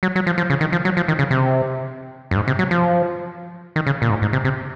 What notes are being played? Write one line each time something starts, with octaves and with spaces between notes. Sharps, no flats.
F#3
F#3
F3
F3
C#3
D#3
F3
F#3
F3
D#3
C#3
C3
F#2
G#2
C3
F#3
F3
D#3
C#3
A#2
G#2
G#2
C3
C3